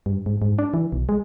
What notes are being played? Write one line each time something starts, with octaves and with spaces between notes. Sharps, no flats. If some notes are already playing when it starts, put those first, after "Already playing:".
G2
G#2
G#2
D4
E3
B1
G#3